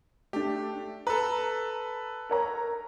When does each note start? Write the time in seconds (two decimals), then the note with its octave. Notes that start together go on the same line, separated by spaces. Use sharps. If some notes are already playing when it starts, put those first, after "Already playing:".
0.33 A3 D4 G4
1.07 A4 B4 A#5
2.30 A#4 C#5 A#5